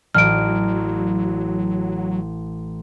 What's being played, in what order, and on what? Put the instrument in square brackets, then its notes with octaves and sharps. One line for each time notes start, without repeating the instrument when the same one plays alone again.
[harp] A1 [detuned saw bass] F#3 [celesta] F6 D7